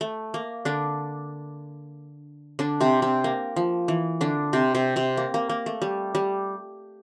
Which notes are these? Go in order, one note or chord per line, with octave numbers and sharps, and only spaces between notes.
A3
A#3
D3 D4
D3 D4
C3 C4
C3 C4
A#3
F3
E3
D3 D4
C3 C4
C3 C4
C3 C4
A#3
A#3
A#3
A3
G3
G3